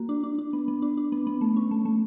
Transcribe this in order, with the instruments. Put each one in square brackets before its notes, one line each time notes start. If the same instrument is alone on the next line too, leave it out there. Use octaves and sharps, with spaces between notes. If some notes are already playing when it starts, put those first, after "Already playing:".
Already playing: [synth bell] A#3 F#4
D4
D4
D4
B3
B3
D4
D4
B3
B3
A3
C#4
A3
A3